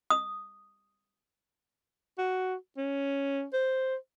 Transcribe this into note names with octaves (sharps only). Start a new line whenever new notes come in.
D#6
F#4
C#4
C5